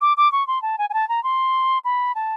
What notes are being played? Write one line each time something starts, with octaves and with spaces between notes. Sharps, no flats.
D6
D6
C#6
C6
A5
G#5
G#5
A5
A#5
C6
B5
A5